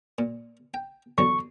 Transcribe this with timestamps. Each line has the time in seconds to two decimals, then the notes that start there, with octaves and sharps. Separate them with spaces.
0.18 A#2
0.74 G5
1.18 E2 D3 F#3 C#6